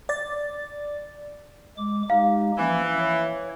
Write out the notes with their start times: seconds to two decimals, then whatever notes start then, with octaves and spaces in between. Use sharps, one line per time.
0.09 D5 A6
1.77 G#3 D6
2.10 G#3 D#4 G4 F5
2.58 E3 F3 A#3 C#4
2.98 C#5